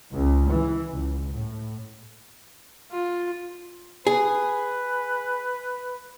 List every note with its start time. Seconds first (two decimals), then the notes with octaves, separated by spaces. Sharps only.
0.11 C#2
0.50 E3
0.92 C#2
1.30 A2
2.92 F4
4.07 G#4 B4